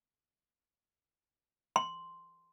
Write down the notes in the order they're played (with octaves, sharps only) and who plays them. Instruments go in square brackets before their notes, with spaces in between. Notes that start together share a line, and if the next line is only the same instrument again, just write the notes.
[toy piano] C6